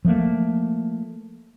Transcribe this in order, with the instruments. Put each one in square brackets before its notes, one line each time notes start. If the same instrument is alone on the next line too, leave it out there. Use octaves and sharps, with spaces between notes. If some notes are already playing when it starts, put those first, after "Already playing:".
[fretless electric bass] F3 G3 A3 A#3